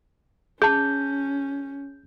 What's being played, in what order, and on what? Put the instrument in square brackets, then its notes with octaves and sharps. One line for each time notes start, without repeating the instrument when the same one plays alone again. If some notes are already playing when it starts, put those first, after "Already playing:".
[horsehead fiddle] C#4 [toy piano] G#4 A5 [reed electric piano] G6